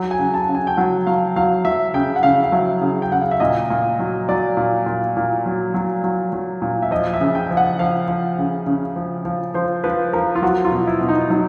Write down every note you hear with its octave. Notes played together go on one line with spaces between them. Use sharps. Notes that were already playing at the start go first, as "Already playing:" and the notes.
Already playing: F#3 F#5
G#5
C#3
A5
C#3
G#5
G5
F#3 F#5
F#3 F5
F#3 F5
F#3 E5
C#3 G5
F#5
C#3 F5
F5
F#3 E5
C#3
G5
C#3 F#5
F5
E5
A#2 D#5
A#2
F#3
F#3 D5
A#2
A#2
A#2
F#3
F#3
F#3
F#3
A#2
E5
F3 D#5
E5
C#3
G5
F3
F#5
F3 F5
F3
C#3
C#3
F3
F3
F3 C5
F3 B4
F3 A#4
F4
F#3 F#4
F4
B2
E4
B2
D#4
F#3 D#4